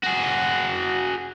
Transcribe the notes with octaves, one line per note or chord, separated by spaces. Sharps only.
F#4 G#4